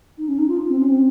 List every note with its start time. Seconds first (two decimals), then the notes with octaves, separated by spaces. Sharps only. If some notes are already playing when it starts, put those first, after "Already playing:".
0.18 D#4
0.28 C#4
0.38 D#4
0.48 F4
0.69 C4
0.79 C#4
0.89 C4